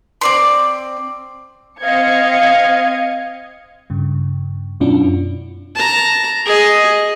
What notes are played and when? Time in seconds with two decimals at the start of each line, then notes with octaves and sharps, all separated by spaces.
0.21 C4 D5 C6
1.80 C4 D#5 F5 G#6 C#7
3.90 G2 C#3
4.80 F#2 B2 C#4 D4 E4 F4
5.75 A5 A#5
6.46 G#4 D#5